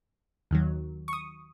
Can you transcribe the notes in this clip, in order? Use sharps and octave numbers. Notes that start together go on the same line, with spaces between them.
D#2 D#3 F#3
C#6
D#6